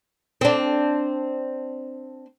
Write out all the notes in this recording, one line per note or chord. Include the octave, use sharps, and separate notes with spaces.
C4 D4